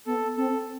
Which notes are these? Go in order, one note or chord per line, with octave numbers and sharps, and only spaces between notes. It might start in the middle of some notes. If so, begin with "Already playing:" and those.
B3 A4
C4 A4